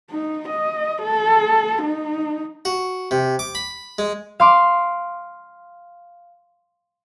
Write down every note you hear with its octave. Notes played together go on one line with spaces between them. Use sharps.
D#4
D#5
A4
D#4
F#4
C3
D6
B5
G#3
F5 C6 D6